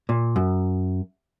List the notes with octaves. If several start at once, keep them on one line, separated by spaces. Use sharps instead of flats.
A#2
F#2